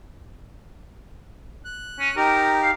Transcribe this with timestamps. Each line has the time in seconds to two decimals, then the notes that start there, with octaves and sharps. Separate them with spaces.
1.65 F#6
1.99 C#4
2.16 D#4 G4 A#4
2.62 F5